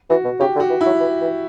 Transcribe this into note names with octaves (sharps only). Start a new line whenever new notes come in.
E3 F#4
B2
C#3 G4
D3
F#4
E3
E4
F#3
E3
E3